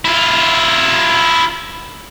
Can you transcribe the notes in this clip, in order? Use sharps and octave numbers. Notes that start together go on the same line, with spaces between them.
E4 F4